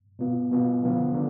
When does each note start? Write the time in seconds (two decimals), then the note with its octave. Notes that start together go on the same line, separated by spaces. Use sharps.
0.19 B2 B3 F4
0.52 B2 B3 F4
0.83 D3 F3 B3 F4
1.14 D3